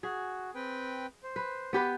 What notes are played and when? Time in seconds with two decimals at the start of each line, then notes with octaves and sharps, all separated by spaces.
0.03 F#4 G#4
0.55 C4 B4 G5
1.23 C5
1.36 B4
1.73 B3 G4 B4